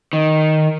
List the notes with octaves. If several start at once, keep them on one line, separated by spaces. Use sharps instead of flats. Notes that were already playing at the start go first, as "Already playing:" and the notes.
D#3